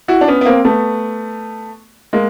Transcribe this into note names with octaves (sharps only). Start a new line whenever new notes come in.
E4 F#4
D4
B3 C#4
B3
A#3 C4
A3 B3
G#3 A#3